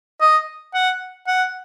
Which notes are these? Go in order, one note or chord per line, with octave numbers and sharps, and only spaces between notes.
D#5
F#5
F#5